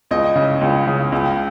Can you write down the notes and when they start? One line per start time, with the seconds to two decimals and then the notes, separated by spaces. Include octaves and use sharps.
0.11 C#2 D#5
0.36 C#3
0.61 C#2
0.87 C#3
1.12 C#2